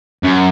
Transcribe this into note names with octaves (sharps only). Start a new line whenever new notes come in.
F#2